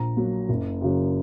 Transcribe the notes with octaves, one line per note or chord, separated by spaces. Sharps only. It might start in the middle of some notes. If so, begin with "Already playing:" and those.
Already playing: A#1 A#5
A#2 F#3
F#1
F#2 C#3 F#3